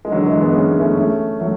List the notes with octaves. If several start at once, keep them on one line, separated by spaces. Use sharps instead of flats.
G#3
D3 F#3
E3 G#3
G#3 B3
C#4
B3
A3 C#4
A3 C#4
F#3 A3